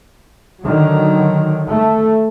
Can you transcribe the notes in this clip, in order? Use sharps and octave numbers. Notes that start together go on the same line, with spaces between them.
D3 D#3 F#3
A3